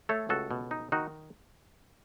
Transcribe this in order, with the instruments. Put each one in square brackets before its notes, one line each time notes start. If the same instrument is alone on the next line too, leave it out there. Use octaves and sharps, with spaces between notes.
[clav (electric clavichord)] A3 A4 C#5
C#2 F#4 A4
B2
D#4
D#3 D#4 F#4